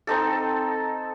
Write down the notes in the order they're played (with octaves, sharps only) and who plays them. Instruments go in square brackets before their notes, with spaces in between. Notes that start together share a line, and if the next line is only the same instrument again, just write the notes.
[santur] C4 D#4 A4